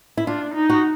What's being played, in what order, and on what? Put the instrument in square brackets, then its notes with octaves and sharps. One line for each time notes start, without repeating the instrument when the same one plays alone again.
[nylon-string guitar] E4
[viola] D4 [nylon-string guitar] F4
[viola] D#4
[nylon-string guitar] F#4